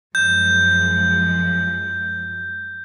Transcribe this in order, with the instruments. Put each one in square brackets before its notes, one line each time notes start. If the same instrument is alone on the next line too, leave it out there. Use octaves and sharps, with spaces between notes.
[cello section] F#2 F3 G#3 [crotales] G6